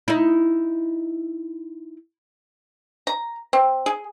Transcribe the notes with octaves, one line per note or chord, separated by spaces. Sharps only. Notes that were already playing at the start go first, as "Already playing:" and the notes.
D#4 E4
A#5
C4
G#4